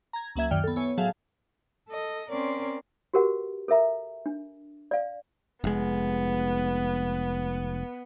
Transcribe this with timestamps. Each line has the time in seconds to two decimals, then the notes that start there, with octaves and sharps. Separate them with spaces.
0.13 A#5 G#6
0.35 C#2 F#3 A#3 E5 G#6
0.51 F#2 D#3 D5 G5 F6
0.64 B3 A4
0.76 B3 E4 C#5 G#5
0.98 A2 F#3 G#4 E5 F5 A5
1.89 A4 D#5
2.30 C4 C#4 A#4 C#5 D5 C6
3.14 F#4 G4 A#4 B4 F#5
3.68 A4 A#4 E5 A#5
4.26 D4
4.91 D5 F5
5.64 F1 G#3 B3